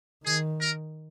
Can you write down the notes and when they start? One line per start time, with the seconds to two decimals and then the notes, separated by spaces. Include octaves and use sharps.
0.24 D#3 G#4
0.60 A#4